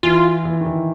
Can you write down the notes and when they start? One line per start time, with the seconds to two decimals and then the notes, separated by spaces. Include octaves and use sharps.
0.03 E3 F4
0.45 E3
0.61 D#3
0.66 E3